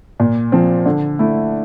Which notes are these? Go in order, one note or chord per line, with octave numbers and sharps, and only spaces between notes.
A#2
F3 C4
D3
A3 E4